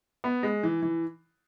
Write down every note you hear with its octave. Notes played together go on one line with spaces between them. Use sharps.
B3
G#3
E3
E3